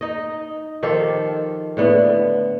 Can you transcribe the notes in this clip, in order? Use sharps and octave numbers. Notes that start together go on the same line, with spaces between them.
D#4 D#5
D#3 F3 G4 A4
A2 D3 B3